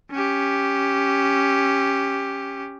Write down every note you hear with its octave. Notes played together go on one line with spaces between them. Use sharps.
C#4 G4